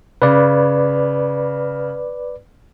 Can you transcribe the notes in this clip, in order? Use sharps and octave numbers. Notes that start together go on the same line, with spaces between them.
C#3 B4 D5